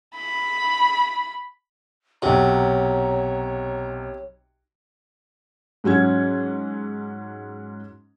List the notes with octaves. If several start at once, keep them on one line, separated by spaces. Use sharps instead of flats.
B5
B1 C3 F#4 C#5 A#5
G#2 F#3 C#4 G#6